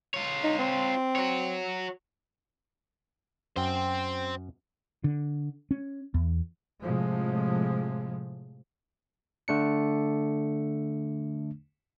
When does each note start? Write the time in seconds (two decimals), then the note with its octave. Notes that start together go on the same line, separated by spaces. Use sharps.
0.14 F4 C#5
0.44 D#4
0.59 C4
1.16 F#4 C#5
3.56 F#2 C5 G5
5.04 D3
5.71 C#4
6.14 E2
6.82 A2 C3 F3 G#3
9.48 D3 A3 D4 C#7